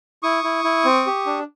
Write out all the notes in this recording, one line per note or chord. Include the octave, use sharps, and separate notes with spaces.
E4 C#6 D#6
E4
E4
C4
G4
D4